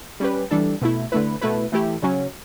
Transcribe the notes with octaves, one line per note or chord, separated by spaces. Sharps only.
G3 C#4 G4 B4
E3 G3 D4 A4
B2 A3 E4
D3 A3 E4 B4
B2 A3 E4 B4
E3 A3 E4 G4
C#3 F#3 C#4